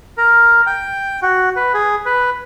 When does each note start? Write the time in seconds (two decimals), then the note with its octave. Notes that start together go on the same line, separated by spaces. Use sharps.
0.18 A#4
0.67 G5
1.22 F#4
1.56 B4
1.74 G#4
2.06 B4